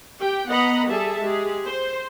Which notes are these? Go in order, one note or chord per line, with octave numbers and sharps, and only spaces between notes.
G4 G5
B3 D#5 F#5 A#5 B5
G3 G#4 A4 E5 A5
G#3 G4 G#4
C5